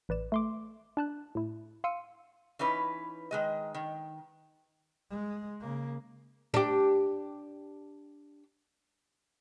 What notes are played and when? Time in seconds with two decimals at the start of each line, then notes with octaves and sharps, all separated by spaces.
0.09 A1 B4 D5 E7
0.32 A3 C6 D6
0.97 D4 A5 F#6
1.35 A2 E4
1.84 F5 C6 E6 C#7 D#7
2.59 E3 C#4 D#4 B4
3.31 D#3 G#3 D#5
3.75 D#3
5.10 G#3
5.61 C#3 A#3
6.54 D4 G4